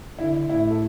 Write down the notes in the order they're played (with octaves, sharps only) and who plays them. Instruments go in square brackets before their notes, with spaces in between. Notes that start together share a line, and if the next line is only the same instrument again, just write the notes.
[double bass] D3 [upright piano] E4
[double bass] A2 [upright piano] E4
[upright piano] A4